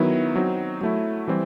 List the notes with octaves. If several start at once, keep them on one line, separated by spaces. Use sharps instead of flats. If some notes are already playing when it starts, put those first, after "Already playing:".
Already playing: D#3 F#3 B3 E4
F#3 C4 D#4
F#3 A3 E4
E3 G3 C4